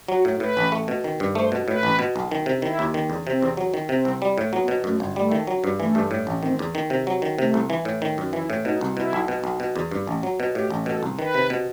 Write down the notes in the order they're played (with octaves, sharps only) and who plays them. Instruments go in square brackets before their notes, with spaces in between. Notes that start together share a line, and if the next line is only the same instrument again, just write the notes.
[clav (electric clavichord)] F#3 [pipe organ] F#4
[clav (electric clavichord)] A2
[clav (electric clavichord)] A2 [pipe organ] B4
[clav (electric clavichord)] A1
A3
B2
D#3
G2
[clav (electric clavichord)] A3 [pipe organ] C5
[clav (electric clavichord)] B2
[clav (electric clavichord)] A2 [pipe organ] B4
[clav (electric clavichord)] A1
B2
B1
D#3
C3
[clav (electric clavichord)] D#3 [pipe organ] E4
[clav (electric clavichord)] D#2
D#3
E2
[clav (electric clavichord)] C3 [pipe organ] C4
[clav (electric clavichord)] E2
F#3
D#3
[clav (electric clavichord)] C3 [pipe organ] C4
[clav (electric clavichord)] C2
G3
A2
[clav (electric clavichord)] F#3 [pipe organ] B3
[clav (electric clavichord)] B2
[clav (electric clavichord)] F#2 [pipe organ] A3
[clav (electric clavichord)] G1
[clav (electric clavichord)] G3 [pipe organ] A3
[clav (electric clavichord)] D#3
F#3
G2
[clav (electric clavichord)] E3 [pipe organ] A3
[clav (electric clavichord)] G2
A2
A1
[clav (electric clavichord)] D#3 [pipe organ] C4
[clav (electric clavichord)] E2
D#3
C3
F#3
D#3
[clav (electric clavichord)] C3 [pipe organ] A3
[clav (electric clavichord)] C2
E3
A2
D#3
F#2
[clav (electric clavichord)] E3 [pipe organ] E4
[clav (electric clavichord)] A2
[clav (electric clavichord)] B2 [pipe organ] D#4
[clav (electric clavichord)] C2
[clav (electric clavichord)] B2 [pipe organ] E4
[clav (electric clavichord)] B1
B2
B1
B2
E2
G2
A1
F#3
B2
[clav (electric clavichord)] A2 [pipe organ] G4
[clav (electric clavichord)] A1
[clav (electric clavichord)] B2 [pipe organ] A4
[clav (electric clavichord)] C2
[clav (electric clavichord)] D#3 [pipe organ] B4
[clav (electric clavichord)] C3
B2